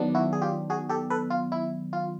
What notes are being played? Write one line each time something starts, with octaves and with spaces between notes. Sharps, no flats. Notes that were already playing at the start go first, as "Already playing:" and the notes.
Already playing: D#3 F#3 B3 D4
E4 F#4
G#4
F4 G4
F#4 G#4
G4 A4
A4 B4
F4
E4
F4